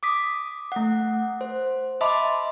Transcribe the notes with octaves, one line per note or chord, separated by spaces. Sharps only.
D6 D#6 B6
A3 F#5
C5
D#5 E5 A5 B5 C6 D6